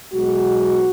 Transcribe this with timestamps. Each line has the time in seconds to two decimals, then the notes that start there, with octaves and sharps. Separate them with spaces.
0.14 B1 B2 G#3 F#4